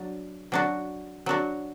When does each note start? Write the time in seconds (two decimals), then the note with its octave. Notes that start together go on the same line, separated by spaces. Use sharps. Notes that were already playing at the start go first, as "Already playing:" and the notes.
Already playing: F#3 D4
0.52 F#3 D4 F#4
1.26 F#3 D4 F#4